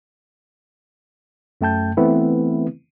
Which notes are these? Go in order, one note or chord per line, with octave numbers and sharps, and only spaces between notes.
F#2 A3 G5 A5 G6
E3 A3 B3 C4 E4 B4